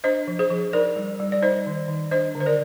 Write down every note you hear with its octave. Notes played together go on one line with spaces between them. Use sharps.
D4 C5 D#5
F3
G#4 C5
F3
D#4 A#4 D5
G3
G3
D5
D#4 C5 D#5
D#3
D#3
D4 C5 D#5
D3
C5
A#4 D5